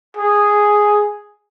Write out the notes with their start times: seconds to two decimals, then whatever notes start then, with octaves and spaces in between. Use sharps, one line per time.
0.17 G#4